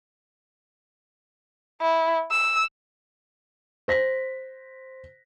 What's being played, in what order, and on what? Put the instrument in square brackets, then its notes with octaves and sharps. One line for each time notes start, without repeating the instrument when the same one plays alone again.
[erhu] E4
E6
[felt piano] C5 A#6 B6